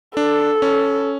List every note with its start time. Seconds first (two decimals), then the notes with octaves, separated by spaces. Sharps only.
0.17 D4 A4
0.62 C#4